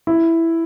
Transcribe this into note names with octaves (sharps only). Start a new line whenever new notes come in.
E4